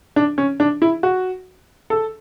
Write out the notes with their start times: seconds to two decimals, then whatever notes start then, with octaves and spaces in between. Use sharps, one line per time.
0.16 D4
0.38 C#4
0.60 D4
0.82 E4
1.03 F#4
1.90 A4